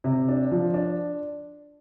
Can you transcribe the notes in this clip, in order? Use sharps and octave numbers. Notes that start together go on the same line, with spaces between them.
C3
D4
F3
D4